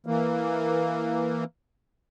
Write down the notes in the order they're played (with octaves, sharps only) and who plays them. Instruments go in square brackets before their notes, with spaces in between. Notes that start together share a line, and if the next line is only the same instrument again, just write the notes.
[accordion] E3 A#3